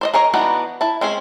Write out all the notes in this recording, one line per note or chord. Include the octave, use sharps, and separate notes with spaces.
C5 D5 D#5
G#4 A#4 C#5 D#5
E3 B3 D4 D#4 F#4
E4 A5
G#3 C4 C#4 G#4